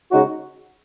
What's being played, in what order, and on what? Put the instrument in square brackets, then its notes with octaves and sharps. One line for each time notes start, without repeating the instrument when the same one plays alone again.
[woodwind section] C#3 G#3 D#4 F#4